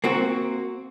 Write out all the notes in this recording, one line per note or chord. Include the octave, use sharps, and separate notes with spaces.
A#3 C4 F#4